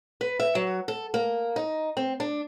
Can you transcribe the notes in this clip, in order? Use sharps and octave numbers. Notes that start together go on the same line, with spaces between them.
B4
E5
F#3
A4
A#3
D#4
C4
D4